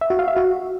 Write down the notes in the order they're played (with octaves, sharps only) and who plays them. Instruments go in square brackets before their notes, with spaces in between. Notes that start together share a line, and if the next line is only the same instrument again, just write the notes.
[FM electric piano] E5
F#4
F5
E5
F#4